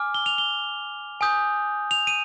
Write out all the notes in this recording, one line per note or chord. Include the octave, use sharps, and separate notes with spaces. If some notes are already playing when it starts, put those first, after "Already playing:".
Already playing: G#5 D6 F6
G7
F7
G7
G#5 D#6 G6
F7
D#7